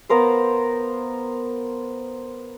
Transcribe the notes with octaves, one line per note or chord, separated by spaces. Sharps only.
B3 A#4 C5 F5